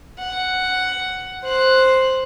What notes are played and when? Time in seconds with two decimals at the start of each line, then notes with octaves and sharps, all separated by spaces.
0.19 F#5
1.44 C5 F#6